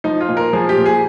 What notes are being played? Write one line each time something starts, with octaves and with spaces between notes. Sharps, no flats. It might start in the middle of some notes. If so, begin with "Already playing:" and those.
F3 D#4
F4
A#2
A#4
F3 G#4
G4
A#2
G#4